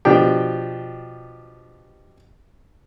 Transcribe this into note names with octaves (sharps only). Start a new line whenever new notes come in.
B2 F3 D4 G4 G5